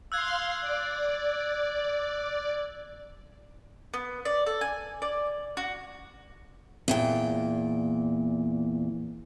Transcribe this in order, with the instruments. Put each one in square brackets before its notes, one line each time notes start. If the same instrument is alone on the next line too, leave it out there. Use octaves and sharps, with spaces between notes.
[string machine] F5 C6 [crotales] E6 F#6 G#6
[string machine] D5
[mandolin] B3
D5
A4
G#5
D5
F#4
[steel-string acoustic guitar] E2 A#2 G5